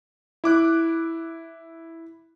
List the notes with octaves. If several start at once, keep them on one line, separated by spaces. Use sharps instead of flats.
E4 D6 F#6